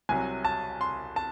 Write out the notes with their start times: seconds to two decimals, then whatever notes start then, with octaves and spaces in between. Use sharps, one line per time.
0.09 C2 C3 F#3 G#5
0.45 A5
0.81 C6
1.16 A5